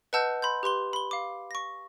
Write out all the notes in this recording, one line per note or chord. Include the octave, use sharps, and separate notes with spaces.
B4 D#5 F#5 A5 E6 G6
B5 C6 G6
G4 B4 C6 G7
B5 G7
F5 D6
C#6 A#6